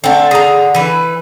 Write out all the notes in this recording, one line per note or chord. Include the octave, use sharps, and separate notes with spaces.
D3 A3 C4
G#4 A#5
E3 B4